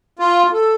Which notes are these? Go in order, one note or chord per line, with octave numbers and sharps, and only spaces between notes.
F4
A4